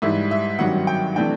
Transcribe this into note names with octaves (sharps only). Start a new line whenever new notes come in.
G#2 E3 G3 E5
E5
G#1 G2 D#3 F#3 F#5
G5
C3 E3 A3 D4 G5